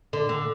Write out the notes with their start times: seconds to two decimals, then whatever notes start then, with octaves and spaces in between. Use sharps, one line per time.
0.13 D3
0.29 D3